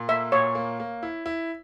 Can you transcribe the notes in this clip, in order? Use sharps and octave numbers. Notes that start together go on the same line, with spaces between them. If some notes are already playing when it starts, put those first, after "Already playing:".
Already playing: A#2
A#3 E5
A#2 C#5
A#3
A#3
E4
E4